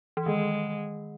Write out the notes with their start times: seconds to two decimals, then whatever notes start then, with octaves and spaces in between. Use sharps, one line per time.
0.17 E3
0.26 D#3 G#3